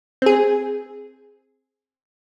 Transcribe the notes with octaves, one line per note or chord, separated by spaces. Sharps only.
C4 G#4